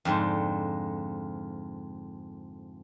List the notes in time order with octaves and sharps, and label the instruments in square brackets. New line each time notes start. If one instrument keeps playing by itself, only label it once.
[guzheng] F2 G#2 D3